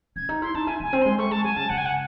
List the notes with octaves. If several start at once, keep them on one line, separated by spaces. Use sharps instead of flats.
C#4 G#6
D#4
E4 C6
D#4 A5
E4 G#5
D#4
A3 G#5
C4
G#3 C6
A3 C#6
G#3 A5
F#3 G#5
C#3 A5
C#3 F#5
G#5
F#5